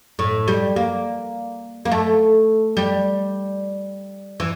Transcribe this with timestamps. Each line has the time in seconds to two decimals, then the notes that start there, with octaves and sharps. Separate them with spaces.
0.19 A2
0.48 G3
0.76 A#3
1.85 A#3
1.92 A3
2.77 G3
4.40 E3